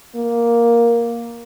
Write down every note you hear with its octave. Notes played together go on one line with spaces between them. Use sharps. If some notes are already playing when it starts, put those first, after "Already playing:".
A#3